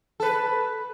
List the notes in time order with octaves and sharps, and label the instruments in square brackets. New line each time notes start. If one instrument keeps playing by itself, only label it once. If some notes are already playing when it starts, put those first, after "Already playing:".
[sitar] A4 B4